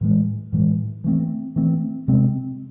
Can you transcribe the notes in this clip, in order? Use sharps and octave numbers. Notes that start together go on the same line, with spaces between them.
A2 E3 G#3
A2 E3 G#3
E3 A3 C4
E3 A3 C4
C3 G#3 C4